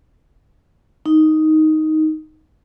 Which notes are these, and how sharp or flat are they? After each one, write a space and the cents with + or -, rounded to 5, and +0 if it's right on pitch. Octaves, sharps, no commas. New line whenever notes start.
D#4 +5